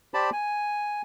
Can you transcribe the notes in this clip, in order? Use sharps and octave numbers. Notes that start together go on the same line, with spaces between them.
G4 C5 D5 A5 B5
G#5